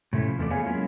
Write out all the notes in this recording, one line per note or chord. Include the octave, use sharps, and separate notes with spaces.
A2 C3 A3 C#4 E4
F3
E2 C3 A3 B3 D5
A3 B3 G#4 C#5 F5 G#5
F#3 G#3 A#3 C#4 E4 F4